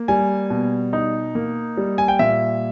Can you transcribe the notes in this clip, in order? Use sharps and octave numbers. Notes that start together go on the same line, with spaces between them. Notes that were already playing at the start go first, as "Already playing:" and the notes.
Already playing: A#3
G3 G#5
B2
D#4
A#3
G3
G#5
G5
A#2 E5